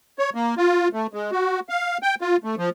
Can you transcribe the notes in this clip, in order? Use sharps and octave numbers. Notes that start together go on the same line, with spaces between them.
C#5
A#3
F4
A3
G#3
F#4
F5
G5
F4
A3
F3